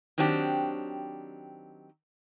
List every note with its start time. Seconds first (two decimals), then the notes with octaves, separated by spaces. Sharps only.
0.18 D#3 F#3 C4 D4 G4